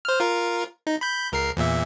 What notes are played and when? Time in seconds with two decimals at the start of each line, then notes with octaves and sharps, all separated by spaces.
0.05 C5 F6
0.20 F4 A#4
0.87 D#4
1.01 B5 G6
1.32 C#2 A#4 C7
1.57 E2 A#2 E5